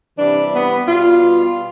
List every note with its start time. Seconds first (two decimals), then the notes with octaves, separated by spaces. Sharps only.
0.19 C3 E3 G3 D4
0.54 B3
0.87 B2 G3 F4